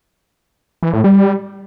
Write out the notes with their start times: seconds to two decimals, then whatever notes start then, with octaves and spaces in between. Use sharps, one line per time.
0.83 E3
0.93 A2
1.04 G3